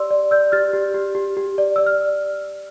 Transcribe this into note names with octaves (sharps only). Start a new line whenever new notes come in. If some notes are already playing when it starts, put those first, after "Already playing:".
Already playing: G4 D5 C6 E6
D5
D5 E6 G6
G4 F6 A6
G4
G4
G4
G4
D5
D5 E6
F6